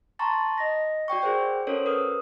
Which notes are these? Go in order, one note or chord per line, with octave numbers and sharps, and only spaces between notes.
A5 A#5 C6 C#6 A6
D#5 A#6
F#4 D5 G5 C#6
F#4 G#4 A#4 C5 G5
C#4 F#4 A4 A#4 C5 C#5
A#4 B4 D#6